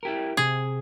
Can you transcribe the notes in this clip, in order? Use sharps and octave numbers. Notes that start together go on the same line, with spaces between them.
E4 G4 A#4
C3 G#4